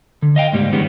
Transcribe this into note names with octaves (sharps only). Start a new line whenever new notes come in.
D3
D#5 F5 G5
C#2 G#2 G3 A#3
G2 D#3 G3 G#3 B3 C#4